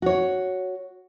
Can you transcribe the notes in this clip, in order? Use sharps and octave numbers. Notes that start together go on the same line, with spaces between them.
F#4 C#5